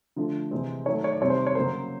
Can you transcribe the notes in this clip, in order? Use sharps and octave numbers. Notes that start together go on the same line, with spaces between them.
D3 F3 A3
C3 E3 G#3 C4
D#3 F#3 A3 C#5
C#5
D5
C3 D#3 G3 C4 C#5
C5
C#5
C#3 F#3 A#3 C5